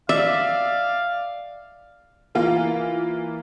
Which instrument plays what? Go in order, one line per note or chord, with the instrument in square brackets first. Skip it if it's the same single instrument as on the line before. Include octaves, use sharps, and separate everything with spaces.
[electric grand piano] D5 [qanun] E5 [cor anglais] F5
[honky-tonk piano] E3 A#3 F4